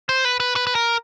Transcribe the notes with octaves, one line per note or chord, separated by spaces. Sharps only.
C5
B4
B4
B4
B4
A#4